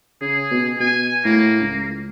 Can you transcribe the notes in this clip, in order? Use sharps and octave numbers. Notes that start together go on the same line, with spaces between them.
C#3 G#4
B2
B2 G#5
A2 A#3
C#2